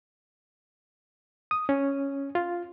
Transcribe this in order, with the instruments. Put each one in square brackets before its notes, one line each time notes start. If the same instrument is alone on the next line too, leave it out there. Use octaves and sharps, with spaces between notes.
[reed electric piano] D#6
C#4
F4